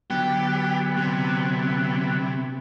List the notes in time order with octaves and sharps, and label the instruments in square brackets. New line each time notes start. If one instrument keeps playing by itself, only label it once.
[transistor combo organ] D3 F#3 B3 [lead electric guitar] G4
[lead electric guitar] C3